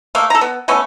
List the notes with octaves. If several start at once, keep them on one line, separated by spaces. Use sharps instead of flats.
A3 A#3 F5
A4 A#5
B3
A3 B3 C#4